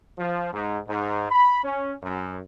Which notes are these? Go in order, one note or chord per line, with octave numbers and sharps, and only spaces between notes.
F3
G#2
G#2
B5
C#4
F#2